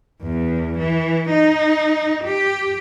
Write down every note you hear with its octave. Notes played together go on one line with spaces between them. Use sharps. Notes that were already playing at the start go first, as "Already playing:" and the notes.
E2
E3
D#4
G4